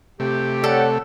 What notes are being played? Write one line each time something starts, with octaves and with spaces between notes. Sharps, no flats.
C3 A3 G4
A4 C#5 D5 F#5